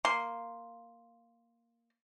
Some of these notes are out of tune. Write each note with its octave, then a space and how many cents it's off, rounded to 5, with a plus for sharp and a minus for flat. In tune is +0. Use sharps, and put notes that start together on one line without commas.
A#3 +0 C6 +0